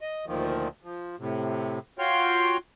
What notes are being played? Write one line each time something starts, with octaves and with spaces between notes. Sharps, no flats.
D#5
D2 A#2 D#3 F3
F3
A2 C3
F4 F#4 C#5 F5 G5 C6